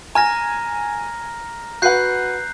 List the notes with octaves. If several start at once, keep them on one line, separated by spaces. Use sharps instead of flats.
G#5 A#5 F6 A#6
F#4 B4 F#5 F#6 G6 C7